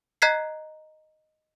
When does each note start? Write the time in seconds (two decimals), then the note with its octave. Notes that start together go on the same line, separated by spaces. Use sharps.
0.22 D#5 A#5 F#6 G#6 B6 C7